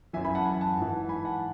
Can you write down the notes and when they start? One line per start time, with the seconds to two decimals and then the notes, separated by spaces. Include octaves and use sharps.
0.13 F#2 E3 E5 G#5
0.25 G#5 B5
0.35 F#5 A5
0.45 G#5 B5
0.61 F#5 A5
0.77 G#2 E3
1.09 G#5 B5
1.25 F#5 A5